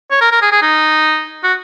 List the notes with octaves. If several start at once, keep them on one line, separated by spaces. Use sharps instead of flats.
C#5
A#4
A#4
G#4
G#4
D#4
F#4